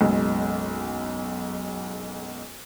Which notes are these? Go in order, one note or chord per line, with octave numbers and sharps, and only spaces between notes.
F#1 B1 G#3